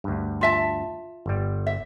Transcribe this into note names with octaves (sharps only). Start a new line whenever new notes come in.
D2 G2
F4 E5 A5
G1 G3
E5